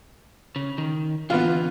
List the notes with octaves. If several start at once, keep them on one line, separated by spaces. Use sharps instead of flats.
C#3
D#3
D3 E3 B3 F4